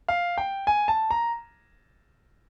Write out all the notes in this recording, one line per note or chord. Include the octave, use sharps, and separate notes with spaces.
F5
G5
G#5
A5
A#5